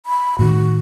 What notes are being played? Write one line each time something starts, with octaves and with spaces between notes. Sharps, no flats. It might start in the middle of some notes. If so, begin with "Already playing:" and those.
B5
A2 D#3 F#4